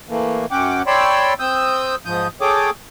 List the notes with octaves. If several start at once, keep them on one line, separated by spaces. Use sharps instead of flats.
E3 A3 A#3
F#2 C#4 F#5 G5 D6
C#5 D5 G5 B5 C6 E6
C4 D#6 E6 G6
G#2 F3 D#6 G6
G#4 A4 C#5 G5 D6 D#6